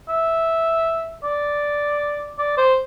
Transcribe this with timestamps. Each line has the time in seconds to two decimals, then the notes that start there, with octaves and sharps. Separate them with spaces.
0.09 E5
1.23 D5
2.39 D5
2.57 C5